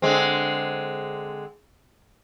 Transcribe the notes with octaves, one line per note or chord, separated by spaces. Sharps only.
D3 G#3 C4